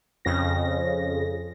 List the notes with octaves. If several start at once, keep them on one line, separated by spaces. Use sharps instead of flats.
F2 C#3 A#6